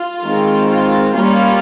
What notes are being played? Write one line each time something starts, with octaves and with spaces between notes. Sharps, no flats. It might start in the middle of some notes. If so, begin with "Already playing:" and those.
Already playing: F4
D#3 G#3 C4
F4
G3 A#3 C#4 F4